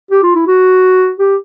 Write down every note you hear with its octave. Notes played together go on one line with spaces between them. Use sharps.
G4
F4
E4
F#4
G4